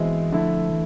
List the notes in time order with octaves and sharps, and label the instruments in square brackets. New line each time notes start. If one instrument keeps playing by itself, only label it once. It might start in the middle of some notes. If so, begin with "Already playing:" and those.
Already playing: [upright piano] B2 G#3 C4 E4 [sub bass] E3
[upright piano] D3 A3 E4 [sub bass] F3
[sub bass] E3